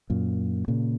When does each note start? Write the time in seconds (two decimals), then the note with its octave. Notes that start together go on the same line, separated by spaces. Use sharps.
0.10 F#2 A#2
0.68 A#2 C#3